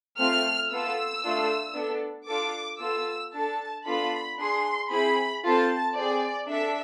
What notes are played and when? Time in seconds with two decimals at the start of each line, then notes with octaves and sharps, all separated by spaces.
0.18 A3 C4 F4 F6
0.70 B3 F4 A4 E6
1.23 A3 D4 F4 A4
1.75 B3 D4 A4
2.27 D4 F4 A4 D6
2.80 B3 F4 A4 E6
3.32 D4 A4 A5
3.85 B3 D4 F4 A4 B5
4.38 D4 G#4 C6
4.91 C4 E4 G#4 B5
5.43 C4 F4 A4 A5
5.94 C4 G#4 D5
6.47 D4 A4 E5